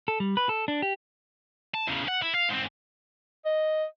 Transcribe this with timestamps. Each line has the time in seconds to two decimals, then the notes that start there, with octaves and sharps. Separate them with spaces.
0.08 A4
0.20 G3
0.37 B4
0.49 A4
0.68 D4
0.82 G4
1.74 A5
1.87 E2 C#3
2.08 F#5
2.22 E4
2.35 F5
2.49 G#2 C4
3.45 D#5